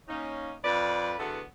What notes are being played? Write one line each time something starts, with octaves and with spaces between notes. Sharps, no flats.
A#3 C#4 D#4
F2 B4 D5
E2 D3 A3 B3 F#4 A4